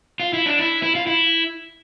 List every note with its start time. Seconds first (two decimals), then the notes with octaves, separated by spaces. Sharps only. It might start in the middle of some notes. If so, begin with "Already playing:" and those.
0.20 F4
0.33 E4
0.46 D4
0.59 E4
0.83 E4
0.95 F4
1.07 E4